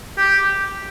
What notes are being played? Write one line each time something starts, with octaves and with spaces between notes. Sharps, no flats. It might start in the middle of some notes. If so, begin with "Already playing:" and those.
G4